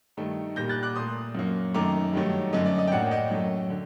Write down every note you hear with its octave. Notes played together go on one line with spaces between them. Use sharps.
G2 D#3 A3
A#2 G3 A#3 G6 A#6
F#6 A6
D6 F#6
A#2 A3 C6 D#6
F#2 F#3 A#3
F#2 D#3 A3 A#5 D6
G2 D#3 F#3 A3
F#2 D3 A3 D#5
D5
D#5
G5
A2 F#3 A#3 D5 F#5
D#5 G5
F#2 F#3 A3
D3